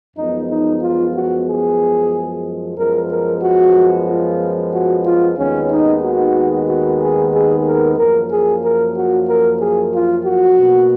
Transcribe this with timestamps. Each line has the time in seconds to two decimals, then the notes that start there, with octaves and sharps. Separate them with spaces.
0.17 F#2 F3 G#3 B3 D#4
0.49 D#4
0.82 F4
1.15 F#4
1.47 G#4
2.77 F#2 F3 G#3 B3 A#4
3.10 A#4
3.42 F#4
4.08 F4
4.72 F#4
5.05 F4
5.38 D#2 D#3 G#3 B3 C#4
5.71 D#4
6.02 F#4
6.68 F#4
7.01 G#4
7.33 G#4
7.66 A#4
7.97 F#2 F3 A#3 A#4
8.31 G#4
8.63 A#4
8.96 F#4
9.28 A#4
9.61 G#4
9.94 F4
10.25 F#4
10.58 B2 A#3